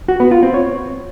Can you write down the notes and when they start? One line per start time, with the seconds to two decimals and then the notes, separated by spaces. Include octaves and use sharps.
0.08 F#4
0.20 B3
0.31 F4
0.43 C4
0.54 C#5